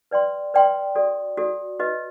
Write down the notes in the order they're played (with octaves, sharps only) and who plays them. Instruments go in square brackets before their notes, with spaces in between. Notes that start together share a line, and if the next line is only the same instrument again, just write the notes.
[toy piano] B4 D5 G5 C6
B4 D5 G5 C6
F#4 A4 D5
F#4 A4 D5
F#4 B4 D#5